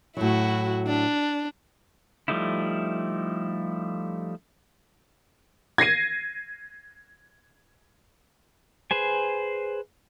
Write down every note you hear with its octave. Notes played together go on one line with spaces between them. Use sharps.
A2 F#3 E4 F#4
D4
F3 G3 A3 D#4 E4
G#6 A#6 C7 D#7
G#4 B4 C5 G#5